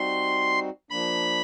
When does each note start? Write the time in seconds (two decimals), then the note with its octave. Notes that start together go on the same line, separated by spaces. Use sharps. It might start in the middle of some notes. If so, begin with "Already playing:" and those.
Already playing: G3 C4 D#4 F#4 C6
0.90 F3 A#3 D4 B5